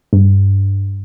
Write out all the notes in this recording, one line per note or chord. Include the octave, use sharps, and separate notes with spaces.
G2